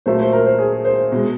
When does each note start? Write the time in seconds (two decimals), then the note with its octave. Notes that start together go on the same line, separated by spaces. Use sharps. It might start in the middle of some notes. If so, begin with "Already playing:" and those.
0.06 A#2 F#3 A3 C5
0.19 C5
0.33 A#4
0.46 C5
0.58 G#4
0.85 C5
1.12 B2 G#3